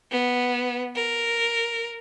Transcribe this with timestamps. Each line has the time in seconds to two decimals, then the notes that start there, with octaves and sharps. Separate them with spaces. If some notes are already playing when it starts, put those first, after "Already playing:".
0.11 B3
0.95 A#4